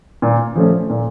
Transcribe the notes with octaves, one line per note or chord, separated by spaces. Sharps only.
A#2
F3 A3 C#4
A#2